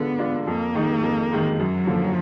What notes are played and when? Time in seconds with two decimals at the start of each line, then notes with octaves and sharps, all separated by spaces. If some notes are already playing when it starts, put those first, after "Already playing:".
Already playing: D3 G#3 B3 D4 F4
0.19 G#3 D4 F4
0.47 F2 A#3
0.75 D#3 G#3 D#4
1.03 F2
1.31 D#3 G#3 D#4
1.59 F#2 F#3
1.87 D3 F3 A#3